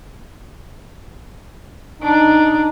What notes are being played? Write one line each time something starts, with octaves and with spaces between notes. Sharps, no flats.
D4 D#4